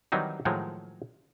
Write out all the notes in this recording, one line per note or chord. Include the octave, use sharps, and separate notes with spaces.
D#3 E3 F#3 G3 C4 D#4
A2 D#3 F3 F#3 G#3